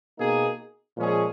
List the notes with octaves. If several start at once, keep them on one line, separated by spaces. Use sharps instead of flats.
B2 A#3 D#4 G#4
A#2 F3 G#3 C#4 G#4